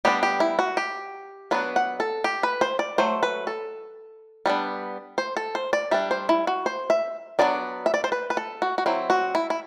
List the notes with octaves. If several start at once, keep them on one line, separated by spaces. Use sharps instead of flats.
G3 B3 D4 G4
G4
E4
F#4
G4
F#3 B3 D4 B4
F#5
A4
G4
B4
C5
D5
F#3 A3 C5
B4
A4
G3 B3 D4
C5
A4
C5
D5
G3 D4 E5
C5
E4
F#4
C5
E5
F#3 B3 D4 D5
E5
D5
C5
B4
B4
A4
F#4
F#4
F#3 C4 E4
F#4
E4
E4